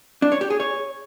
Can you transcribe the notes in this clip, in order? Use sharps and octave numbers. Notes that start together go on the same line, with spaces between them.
D4
C#5
G4
G#4
C#5